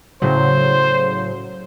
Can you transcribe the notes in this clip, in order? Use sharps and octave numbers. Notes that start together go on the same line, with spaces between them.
A2 C#3 F#3 C5